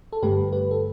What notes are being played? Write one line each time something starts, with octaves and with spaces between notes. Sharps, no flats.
A4
G2 D3 A3 G4 B4
G4 B4
A4